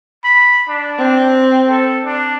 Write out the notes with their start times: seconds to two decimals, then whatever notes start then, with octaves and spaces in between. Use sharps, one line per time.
0.24 B5
0.69 D4
0.98 C4
1.69 A4
2.04 D4